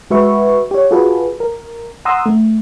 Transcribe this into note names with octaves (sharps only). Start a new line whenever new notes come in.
G#3 F#4 B4 E5 C#6
G4 C#5
F4 F#4 G#4 A4 B4
A#4
F#5 A#5 C6 D#6 E6
A3